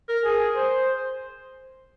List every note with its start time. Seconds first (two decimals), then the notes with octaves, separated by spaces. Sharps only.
0.09 A#4
0.25 G#4
0.56 C5